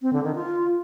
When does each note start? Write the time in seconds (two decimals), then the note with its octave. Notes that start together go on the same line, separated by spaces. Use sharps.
0.02 C4
0.13 D3
0.24 D#3
0.35 F4